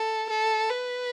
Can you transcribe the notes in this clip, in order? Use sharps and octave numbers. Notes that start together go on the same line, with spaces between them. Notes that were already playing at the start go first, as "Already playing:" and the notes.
Already playing: A4
A4
B4